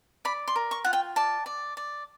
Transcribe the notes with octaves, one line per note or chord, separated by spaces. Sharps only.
D5 B5
C6
A#4
C#6
F4 F#5
G5
D5 A5
D5
D5